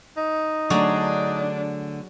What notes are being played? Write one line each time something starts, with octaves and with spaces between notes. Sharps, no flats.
D#4
D3 F#3 A3 D4 G#4 D5